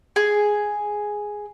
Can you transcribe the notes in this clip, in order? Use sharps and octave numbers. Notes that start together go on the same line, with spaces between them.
G#4